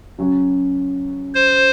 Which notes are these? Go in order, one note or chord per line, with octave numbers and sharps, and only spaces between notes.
C#3 F#3 C#4 F#4
C5